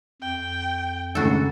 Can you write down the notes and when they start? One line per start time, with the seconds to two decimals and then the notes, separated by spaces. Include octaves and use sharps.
0.22 F2 G5
1.15 G#1 D2 C#3 F#4 A4